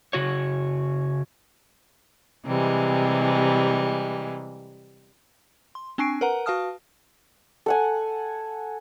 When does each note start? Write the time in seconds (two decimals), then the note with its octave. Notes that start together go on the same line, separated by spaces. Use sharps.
0.13 C#3 F#4 C#5
2.45 C3 E3 G3 G#3
5.75 C6
5.98 C4 D4 G#5 C#6 C7 D7
6.21 A#4 B4 F#5 A#5
6.46 F#4 B4 F5 A5 D#6 F6
7.66 A4 F#5 G#5